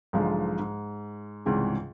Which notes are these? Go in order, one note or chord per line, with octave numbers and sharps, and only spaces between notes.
B1 G#2 D3 F3 G#3
G#2
C#2 G#2 C3 E3 G3